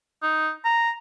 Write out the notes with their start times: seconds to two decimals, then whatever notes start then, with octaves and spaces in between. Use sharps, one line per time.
0.23 D#4
0.65 A#5